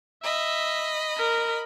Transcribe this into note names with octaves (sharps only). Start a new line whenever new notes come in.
D#5 E5 B5
A#4